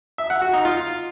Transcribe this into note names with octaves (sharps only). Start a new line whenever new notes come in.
E5
F#5
F#4
D#4
F4